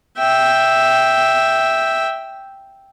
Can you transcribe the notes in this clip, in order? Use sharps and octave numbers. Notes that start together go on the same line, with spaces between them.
E5 G5